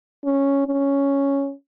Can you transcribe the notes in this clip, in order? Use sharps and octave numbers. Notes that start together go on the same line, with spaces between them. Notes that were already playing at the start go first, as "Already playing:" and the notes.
C#4
C#4